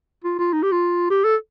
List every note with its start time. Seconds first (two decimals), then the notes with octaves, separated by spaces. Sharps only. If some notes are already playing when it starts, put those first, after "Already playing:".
0.24 F4
0.39 F4
0.53 D#4
0.63 G4
0.72 F4
1.11 G4
1.24 A4